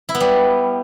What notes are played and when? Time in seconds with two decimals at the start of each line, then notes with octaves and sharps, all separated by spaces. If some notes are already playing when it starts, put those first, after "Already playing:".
0.09 E4
0.15 B3
0.20 G3